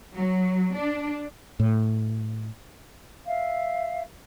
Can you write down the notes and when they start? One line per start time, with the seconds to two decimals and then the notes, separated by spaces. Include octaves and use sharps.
0.15 F#3
0.75 D4
1.60 A2
3.26 E5 F5